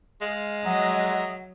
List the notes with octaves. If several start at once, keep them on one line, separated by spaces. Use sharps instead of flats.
G#3 F5
F#3 D#5 E5 F#5 A#5